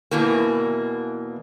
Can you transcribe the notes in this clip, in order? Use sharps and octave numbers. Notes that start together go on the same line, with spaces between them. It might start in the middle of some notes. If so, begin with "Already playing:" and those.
E2 B2 E3 A#3